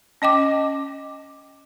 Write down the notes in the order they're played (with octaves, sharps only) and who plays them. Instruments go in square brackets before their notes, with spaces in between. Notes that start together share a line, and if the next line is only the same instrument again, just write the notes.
[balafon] C#4 D#5 G5 D6